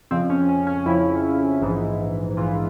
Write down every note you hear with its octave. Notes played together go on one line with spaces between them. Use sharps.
F2 C#3 F3 C4
C#4
C#4
C#4
F2 C#3 F3 E4
A#1 G#2 E3
A#1 G#2 E3 F4